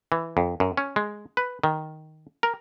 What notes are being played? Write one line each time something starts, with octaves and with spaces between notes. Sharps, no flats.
E3
F2
F#2
C#4
G#3
B4
D#3
A#4